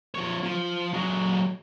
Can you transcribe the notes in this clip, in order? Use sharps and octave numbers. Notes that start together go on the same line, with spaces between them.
F3 C#5
F3
F#3 G#3